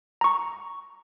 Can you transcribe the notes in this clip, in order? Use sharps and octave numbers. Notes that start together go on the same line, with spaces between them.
A#5 C#6